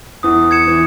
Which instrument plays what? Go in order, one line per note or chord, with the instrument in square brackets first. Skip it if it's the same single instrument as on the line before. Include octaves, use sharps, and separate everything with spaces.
[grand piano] E2 E3 [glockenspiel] D#6
[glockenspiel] G#6 C#7 E7
[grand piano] E3